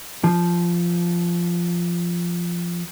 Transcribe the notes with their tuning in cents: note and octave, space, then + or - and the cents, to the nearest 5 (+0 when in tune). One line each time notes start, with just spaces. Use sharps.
F3 -10